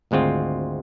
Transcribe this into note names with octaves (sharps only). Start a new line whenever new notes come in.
G#1 D2 G#3 C4 F4